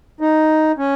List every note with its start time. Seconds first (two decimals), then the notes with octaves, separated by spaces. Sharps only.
0.21 D#4
0.78 C#4